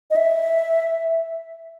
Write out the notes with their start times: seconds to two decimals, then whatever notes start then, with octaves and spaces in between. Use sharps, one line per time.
0.11 D#5
0.16 E5